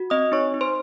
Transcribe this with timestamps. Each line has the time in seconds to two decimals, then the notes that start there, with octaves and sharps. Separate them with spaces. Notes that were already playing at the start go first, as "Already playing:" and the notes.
Already playing: F#4
0.10 C4 D#5 D#6
0.32 D#4 C#5 C#6
0.54 D#4
0.61 C5 C6